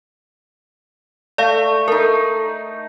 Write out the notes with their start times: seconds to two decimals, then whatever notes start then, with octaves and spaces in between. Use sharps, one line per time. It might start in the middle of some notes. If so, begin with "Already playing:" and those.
1.38 A3 D5 F5
1.88 A3 D#4 A#4